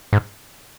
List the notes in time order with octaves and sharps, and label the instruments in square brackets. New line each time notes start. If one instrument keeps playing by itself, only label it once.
[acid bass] G#2